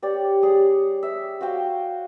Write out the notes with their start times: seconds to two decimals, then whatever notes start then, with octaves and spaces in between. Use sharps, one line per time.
0.02 G4 C#5 D5
0.42 G3 G#4 C#5
1.03 E5
1.41 F#4 C5 F5 G5